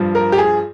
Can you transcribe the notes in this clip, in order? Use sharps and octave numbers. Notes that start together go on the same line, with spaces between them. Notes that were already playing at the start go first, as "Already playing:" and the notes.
Already playing: G2 F3
A#4
G4
G#4